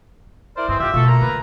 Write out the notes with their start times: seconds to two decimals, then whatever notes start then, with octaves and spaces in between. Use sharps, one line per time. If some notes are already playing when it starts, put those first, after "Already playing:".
0.57 E4 A#4 C5 D5
0.68 G2 E3 G#3 C4
0.80 G#1 A2 F4 G4 E5
0.94 B2 A3 F4 F#4 A4
1.08 A#3 A#5
1.21 D3 B4